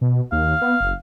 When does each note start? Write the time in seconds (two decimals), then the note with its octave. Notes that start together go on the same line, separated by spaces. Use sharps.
0.01 B2
0.32 D#2 F5
0.62 B3
0.81 F#1